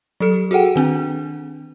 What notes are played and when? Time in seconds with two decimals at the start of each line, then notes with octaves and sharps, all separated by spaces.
0.20 F#3 G4 A4 C#7
0.51 F#4 G#4 A4 F#5 G5
0.76 D#3 C4 D4